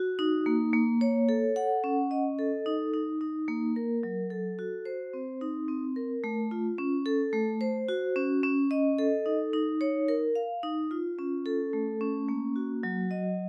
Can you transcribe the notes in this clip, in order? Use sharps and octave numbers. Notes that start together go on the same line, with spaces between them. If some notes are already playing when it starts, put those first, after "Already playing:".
Already playing: F#4
D#4
A#3
A#3
C#5
A4
F#5
C#4
D#5
A4
D#4
D#4
D#4
A#3
A#4
F#3
A4
F#4
C5
C4
D#4
C4
A#4
A3
F4
C#4
A4
A3
C5
F#4
C#4
C#4
D#5
A4
D#4
D#4
C#5
A#4
F5
D#4
F4
C#4
A4
A3
C#4
A#3
F#4
F#3
D#5